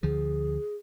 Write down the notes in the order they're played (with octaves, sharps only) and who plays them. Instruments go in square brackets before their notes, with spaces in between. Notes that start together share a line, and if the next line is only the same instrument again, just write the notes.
[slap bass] D2 D3 F3 [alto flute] G#4